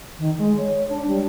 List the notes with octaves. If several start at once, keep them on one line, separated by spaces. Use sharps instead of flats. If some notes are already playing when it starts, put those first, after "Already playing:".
D#3
G#3
C#5
D4
G3